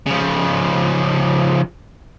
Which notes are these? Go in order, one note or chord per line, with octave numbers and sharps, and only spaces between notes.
C#3 F3